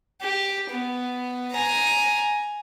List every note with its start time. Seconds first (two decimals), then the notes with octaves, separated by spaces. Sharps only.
0.22 G4
0.70 B3
1.53 G#5 A#5